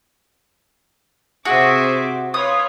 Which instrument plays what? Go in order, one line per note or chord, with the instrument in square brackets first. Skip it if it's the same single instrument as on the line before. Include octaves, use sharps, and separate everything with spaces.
[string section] C3 C5 D6 [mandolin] F#4 [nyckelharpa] G#4 E5
[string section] F4 [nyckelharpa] B4 C#5 [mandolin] D#6